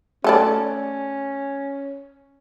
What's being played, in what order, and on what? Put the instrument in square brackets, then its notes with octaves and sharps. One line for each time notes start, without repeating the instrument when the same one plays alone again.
[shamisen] A3 A4 D5 [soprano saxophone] C#4